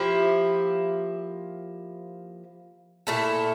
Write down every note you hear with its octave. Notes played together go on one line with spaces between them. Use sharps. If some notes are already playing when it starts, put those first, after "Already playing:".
Already playing: F3 A#3 E4 G4
A#2 A3 E4 A4